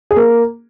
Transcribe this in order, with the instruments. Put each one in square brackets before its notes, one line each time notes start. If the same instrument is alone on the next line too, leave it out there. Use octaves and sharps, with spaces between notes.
[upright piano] G#4
A#3